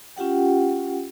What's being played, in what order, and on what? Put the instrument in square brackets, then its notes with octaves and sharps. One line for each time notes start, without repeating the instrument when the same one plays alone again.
[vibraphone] C#4 F4 G4 F#5 G5